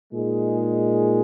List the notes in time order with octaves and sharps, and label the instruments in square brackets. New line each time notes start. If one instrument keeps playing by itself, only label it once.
[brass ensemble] A#2 G#3 D#4 G#4